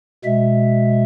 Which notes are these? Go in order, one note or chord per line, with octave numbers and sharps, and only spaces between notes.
B2 G#3 E5